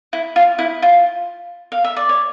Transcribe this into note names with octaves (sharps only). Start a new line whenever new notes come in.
E4
F4
E4
F4
F5
E5
D5
C#5